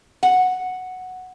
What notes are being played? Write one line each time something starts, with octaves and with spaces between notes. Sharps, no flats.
F#5